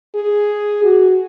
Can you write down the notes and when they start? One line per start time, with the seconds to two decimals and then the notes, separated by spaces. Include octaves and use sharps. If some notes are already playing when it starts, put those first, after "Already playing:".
0.15 G#4
0.83 F#4